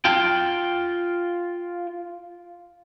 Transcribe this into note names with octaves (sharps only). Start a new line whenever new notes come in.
F4 G5